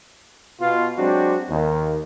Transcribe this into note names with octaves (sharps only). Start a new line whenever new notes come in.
B2 F4
F#3 G#3 C4 D4 F#4 G4
D#2